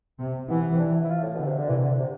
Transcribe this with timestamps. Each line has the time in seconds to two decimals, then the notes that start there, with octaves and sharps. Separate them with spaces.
0.20 C3
0.49 E3 B3
0.74 C4
0.79 D4
0.94 E4
1.04 E4
1.10 F4
1.23 A2
1.35 B2 D3
1.46 C3
1.57 D3
1.69 C3 E3
1.84 D3
1.99 C3